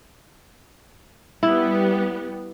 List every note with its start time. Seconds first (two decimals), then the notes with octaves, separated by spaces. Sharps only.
1.43 G3 B3 E4 G4